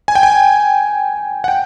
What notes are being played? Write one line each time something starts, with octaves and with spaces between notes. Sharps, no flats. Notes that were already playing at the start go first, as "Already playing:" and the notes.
G#5
G5
G#5
F#5
G5